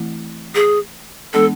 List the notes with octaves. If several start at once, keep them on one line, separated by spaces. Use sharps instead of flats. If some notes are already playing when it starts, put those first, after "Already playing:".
Already playing: E3 A3 C4 E4
G#4
E3 G#3 B3 D4 A4